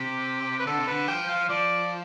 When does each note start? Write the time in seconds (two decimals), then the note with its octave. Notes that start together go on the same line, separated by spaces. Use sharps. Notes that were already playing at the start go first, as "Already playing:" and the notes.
Already playing: C3 G4
0.59 B4
0.67 D3 A4
0.78 C3
0.87 D3 B4
1.08 F3 G5
1.29 F5
1.49 F3 D5